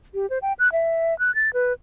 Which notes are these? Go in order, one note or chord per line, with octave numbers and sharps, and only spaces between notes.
G4
C5
G5
F#6
E5
F#6
A6
B4